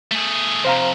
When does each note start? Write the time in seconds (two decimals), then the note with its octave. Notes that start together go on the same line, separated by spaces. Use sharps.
0.11 A3 G#4
0.65 F2 C3 C5 F5 A#5